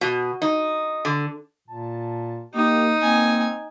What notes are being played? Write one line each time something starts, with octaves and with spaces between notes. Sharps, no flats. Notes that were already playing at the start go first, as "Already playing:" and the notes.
B2
D#4
D3
A#2 A5
A#3 D#4 G4
A#3 C4 G#5